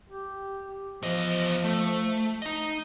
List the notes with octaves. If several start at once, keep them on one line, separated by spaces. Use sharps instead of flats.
G4
E2 F3 D#5
A3
D#4 D#5